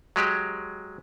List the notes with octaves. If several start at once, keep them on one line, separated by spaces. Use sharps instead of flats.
F#3 G#3 G4